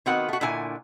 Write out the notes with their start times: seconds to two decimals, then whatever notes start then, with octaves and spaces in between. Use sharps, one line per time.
0.06 D#3 B3 C4 F#4 F#5
0.29 A3 F#4
0.41 A#2 D3 E4 G#5